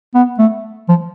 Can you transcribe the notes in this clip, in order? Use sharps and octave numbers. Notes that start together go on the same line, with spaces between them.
B3
A3
F3